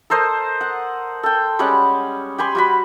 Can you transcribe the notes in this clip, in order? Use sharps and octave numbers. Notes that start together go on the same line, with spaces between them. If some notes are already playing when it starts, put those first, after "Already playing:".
A4 A#4 C5 D#5
F#5
A4 G5
G3 G#3 C#4 F#5
G4 G#5 B5 C6
G3 F#4 B5